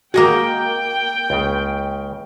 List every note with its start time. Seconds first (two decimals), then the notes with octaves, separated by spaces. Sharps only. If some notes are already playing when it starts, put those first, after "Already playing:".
0.14 A#3 F#4 D#5 G5 G#5
1.30 C#2 C#3